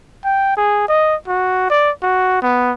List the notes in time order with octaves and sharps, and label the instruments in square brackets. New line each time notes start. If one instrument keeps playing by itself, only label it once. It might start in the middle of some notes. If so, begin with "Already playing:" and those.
[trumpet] G5
G#4
D#5
F#4
D5
F#4
B3